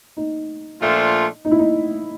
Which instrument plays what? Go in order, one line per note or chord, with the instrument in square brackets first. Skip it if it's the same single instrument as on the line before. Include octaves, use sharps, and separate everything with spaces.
[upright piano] D#4
[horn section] A#2 F3 A3 D4 F4
[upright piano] D#4
E4
D#4